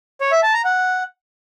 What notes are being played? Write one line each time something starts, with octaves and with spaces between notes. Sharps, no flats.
C#5
E5
A5
A#5
F#5